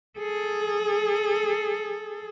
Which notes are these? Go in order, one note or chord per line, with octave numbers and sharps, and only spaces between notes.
G#4 A4